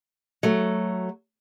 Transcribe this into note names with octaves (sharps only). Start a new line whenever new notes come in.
F#3 A3